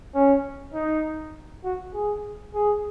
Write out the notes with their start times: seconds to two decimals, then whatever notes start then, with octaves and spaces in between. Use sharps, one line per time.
0.15 C#4
0.74 D#4
1.64 F#4
1.94 G#4
2.55 G#4